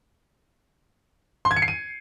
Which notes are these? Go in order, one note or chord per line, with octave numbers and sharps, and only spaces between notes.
C6
G#6
C#7
C7
D#7